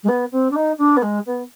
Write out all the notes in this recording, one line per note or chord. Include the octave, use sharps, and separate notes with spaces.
G#3
B3
C4
D4
D#4
D4
B3
G#3
B3